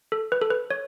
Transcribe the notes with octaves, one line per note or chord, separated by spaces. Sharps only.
A4
B4
A4
B4
C#5